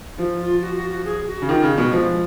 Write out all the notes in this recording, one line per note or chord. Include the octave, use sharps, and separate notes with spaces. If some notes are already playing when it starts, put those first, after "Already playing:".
F3
F4
F#4
F#4
F#4
G#4
F#4
C#3
D#3 F4
C#3
B2
F3 G#3